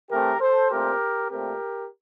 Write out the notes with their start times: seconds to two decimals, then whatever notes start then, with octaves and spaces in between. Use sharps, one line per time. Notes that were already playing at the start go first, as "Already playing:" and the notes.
0.10 E3 A3 C4 G4 A#4
0.40 A4 C5
0.70 A#2 A3 C4 G4 A#4
1.31 A#2 A3 C4 G4 A#4